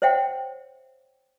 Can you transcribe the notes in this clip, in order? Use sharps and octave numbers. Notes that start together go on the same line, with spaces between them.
C5 C#5 E5 F#5 G5